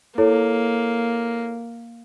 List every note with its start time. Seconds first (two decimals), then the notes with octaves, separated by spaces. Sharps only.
0.18 A#3 E4 A4 C#5